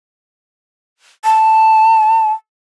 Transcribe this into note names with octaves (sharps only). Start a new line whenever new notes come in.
A5